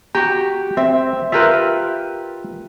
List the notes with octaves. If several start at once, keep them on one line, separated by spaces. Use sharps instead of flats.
F#4 G4 A#5
C4 E5
F4 G4 A#4 B4 E5